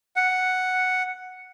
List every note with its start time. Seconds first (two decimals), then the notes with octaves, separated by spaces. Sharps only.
0.16 F#5